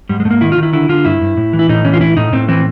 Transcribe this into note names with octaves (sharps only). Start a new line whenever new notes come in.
G#2 G3
G#3
G#2 A3
A#3
D#3 E4
F4
D#3
E4
D3 E4
D3 F4
G2 E4
G2
A2
E3
E4
A2 D#4
E3 C#4
F4
A2 E4
A2 D#4
A2 C4
E3 C4